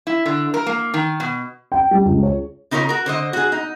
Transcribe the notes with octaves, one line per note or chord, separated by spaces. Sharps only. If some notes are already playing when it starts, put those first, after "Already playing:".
E4
D3
A#4
A#3
D#3
B2
G5
G3
C#2
C#5
C#3 D#4 F4 A#4 C#5
F#4 A#4
D3 C5 D#5
F#4 G#4
D#4